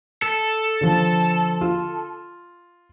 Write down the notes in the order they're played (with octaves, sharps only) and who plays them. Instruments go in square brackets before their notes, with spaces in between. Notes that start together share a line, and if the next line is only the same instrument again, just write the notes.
[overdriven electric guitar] A4
[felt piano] D3 F3
F4